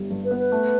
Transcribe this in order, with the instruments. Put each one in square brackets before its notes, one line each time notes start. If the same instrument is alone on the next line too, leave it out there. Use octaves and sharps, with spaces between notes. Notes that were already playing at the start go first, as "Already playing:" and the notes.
Already playing: [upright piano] G1 G3
G2
[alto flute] B4
[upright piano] B3
[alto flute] B4
[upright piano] A3